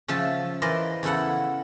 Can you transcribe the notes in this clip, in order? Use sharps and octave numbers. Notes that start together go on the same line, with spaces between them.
C#3 F3 E5 A5
E3 A#4 C5 D5 D#5
E2 C#3 E4 A4 F#5